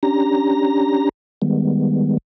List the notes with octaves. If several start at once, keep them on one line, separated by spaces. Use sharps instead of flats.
C#4 D4 G4 A#5 A#6
D#3 G3 G#3 B3